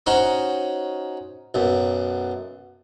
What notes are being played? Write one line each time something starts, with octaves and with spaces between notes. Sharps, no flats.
C#4 D#4 F#4 C5
B1 F#2